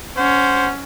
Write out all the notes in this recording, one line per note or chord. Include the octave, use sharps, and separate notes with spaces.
C#4 C5 F#5